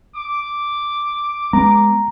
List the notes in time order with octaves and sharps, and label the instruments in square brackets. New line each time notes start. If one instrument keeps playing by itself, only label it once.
[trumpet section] D6
[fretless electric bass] G#3 B3 [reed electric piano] A#5